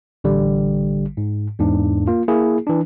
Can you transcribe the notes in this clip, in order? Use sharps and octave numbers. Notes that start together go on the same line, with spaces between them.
A1 D3 G3
G#2
E2 G#2 D4
A#3 F4
A#3 E4 G#4
E3 D4